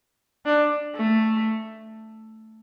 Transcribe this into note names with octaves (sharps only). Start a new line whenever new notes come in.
D4
A3